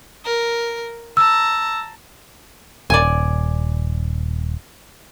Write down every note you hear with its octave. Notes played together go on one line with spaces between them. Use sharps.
A#4
A5 A#5 E6
D#1 D5 G#5